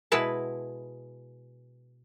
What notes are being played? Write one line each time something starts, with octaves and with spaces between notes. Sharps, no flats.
B2 G#3 E4 B4 A5